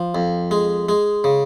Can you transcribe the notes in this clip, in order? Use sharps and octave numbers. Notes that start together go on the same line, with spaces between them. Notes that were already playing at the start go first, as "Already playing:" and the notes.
Already playing: F3
F2
G#3
G#3
C#3